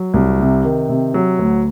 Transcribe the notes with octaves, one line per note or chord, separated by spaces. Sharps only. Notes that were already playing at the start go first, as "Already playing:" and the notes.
Already playing: F#3
C2
C3
D#3
C3
F#3
D2